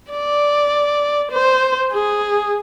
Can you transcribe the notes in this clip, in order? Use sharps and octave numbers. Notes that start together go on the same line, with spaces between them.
D5
C5
G#4